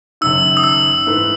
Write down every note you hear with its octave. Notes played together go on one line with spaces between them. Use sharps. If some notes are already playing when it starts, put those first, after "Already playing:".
F#1 F#2 D#3 E6
D#6
E6
G#2 E3 A3 E4 B4